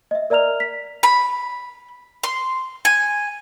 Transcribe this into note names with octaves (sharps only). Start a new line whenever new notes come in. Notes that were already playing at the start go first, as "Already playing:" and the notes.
D#5 E5
A#4 D5 E5 A#5 F6 F7
B6
B5
C6
G#5